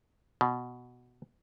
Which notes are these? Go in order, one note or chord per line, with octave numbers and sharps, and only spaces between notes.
B2